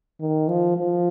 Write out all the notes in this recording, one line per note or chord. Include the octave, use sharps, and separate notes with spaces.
D#3
F3
F3